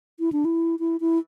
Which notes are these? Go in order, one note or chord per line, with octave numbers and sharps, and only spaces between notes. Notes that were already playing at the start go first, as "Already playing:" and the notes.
E4
D4
E4
E4
E4